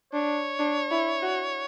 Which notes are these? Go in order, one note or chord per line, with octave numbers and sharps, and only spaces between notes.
D4 C#5
D4
E4
F#4